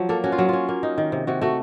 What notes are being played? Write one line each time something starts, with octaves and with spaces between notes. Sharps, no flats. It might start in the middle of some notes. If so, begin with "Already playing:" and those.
Already playing: F3 F#3
A#3 A4
C#4 F#4
F4
F#3
C#4 F4
A#3
D#4
D#3
C3
C3 F#4
A3 F#4